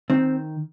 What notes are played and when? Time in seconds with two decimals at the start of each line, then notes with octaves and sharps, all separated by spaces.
0.10 D#3 C4